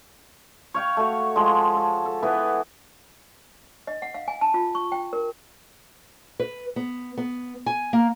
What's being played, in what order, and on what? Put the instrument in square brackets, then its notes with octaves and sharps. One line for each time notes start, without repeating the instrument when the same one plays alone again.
[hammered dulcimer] C#5 F5 G5
A3 F#4
F3 G#3
A4
A4
E3 B3 B4
[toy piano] D#5
F#5
F5
G#5
A5
F4
C#6
G5
A#4
[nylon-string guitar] B4
B3
B3
G#5
A#3